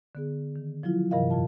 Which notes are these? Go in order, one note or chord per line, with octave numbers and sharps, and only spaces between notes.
D3 B3 G#4
D#3
F3 F#3 E4 F4
G2 C3 E3 A#4 D#5 F5
F2 A#2 F4 A5